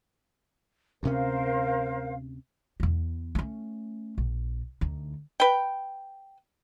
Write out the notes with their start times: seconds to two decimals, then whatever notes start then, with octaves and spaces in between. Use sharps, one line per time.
1.03 D2 C3 C#4 A#4 C5 F5
2.80 E2 B3
3.35 A3 C#4
4.18 A#1
4.81 D2 D#4
5.40 B4 G5